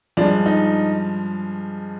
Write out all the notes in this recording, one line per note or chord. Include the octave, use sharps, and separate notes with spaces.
G2 F3 G#3 D4
D#4